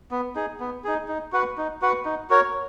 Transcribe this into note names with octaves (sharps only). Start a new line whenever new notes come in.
B3
D#4 G#4
B3
D#4 G#4
D#4
F#4 B4 F#5
D#4
F#4 B4 F#5
D#4
F#4 A#4 C#5